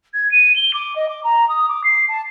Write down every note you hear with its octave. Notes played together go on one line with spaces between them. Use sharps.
G#6
D#7
G7
D6
D#5
D6
A#5
D#6
D6
C7
A5